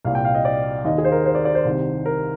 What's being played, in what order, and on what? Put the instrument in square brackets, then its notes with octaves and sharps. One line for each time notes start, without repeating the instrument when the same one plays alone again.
[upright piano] C2 A#2 F5
G5
F5
D#5
D5
D#2 D#3 D#5
G#4
C5
A#4
C5
D5
D5
C5
C2 C3 D#3
A#4